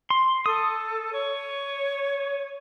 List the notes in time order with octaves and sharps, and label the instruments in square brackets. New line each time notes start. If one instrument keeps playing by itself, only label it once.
[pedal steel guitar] C6
[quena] A4 [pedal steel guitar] D#6
[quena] C#5